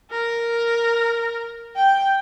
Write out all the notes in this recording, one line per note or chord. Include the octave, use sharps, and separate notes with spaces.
A#4
G5